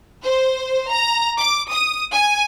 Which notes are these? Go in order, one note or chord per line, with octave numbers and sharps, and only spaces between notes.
C5
A#5
D6
D#6
G#5